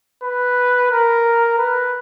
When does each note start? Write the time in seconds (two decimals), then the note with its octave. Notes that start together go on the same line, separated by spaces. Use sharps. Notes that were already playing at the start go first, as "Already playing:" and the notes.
0.23 B4
0.91 A#4
1.59 B4